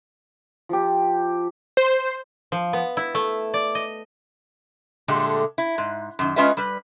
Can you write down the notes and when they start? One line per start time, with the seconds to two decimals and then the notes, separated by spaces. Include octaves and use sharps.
0.69 F3 G4
1.77 C5
2.52 F3
2.73 B3
2.97 E4
3.15 A3
3.54 D5
3.75 D#5
5.08 A#2 D3 G#3 A3 G4 A4
5.58 E4
5.78 G#2
6.19 F#2 D#3
6.36 G#3 C#4 F4 B4 D#5 E5
6.57 G3 B4